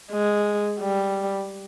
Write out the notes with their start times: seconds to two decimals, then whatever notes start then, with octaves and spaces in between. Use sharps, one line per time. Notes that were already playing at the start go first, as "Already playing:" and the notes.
0.12 G#3
0.80 G3